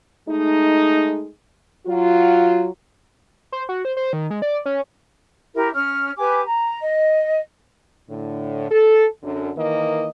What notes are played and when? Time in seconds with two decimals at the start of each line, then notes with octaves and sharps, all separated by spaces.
0.28 G#3 A3 D#4
1.87 F#3 F4
3.52 C5
3.69 F#4
3.85 C5
3.97 C5
4.13 D#3
4.30 G#3
4.42 D5
4.66 C#4
5.54 E4 G4 A#4
5.73 C#4 F6
6.17 G4 B4 G#5 D6
6.46 A#5
6.79 D#5
8.09 A2 D3
8.70 A4
9.23 F#2 D3
9.56 D#3 E3 A#3 D#5